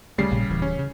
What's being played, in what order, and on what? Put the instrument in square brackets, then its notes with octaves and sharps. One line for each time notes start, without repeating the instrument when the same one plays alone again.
[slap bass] D2 F#3 A3 [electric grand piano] C#3 G3 C7
[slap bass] A#1 A#2
D1 E3
[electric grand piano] C#4
[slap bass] C#3